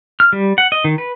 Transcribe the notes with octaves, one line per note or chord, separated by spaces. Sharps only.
F6
G3
F#5
D#5
D#3
B4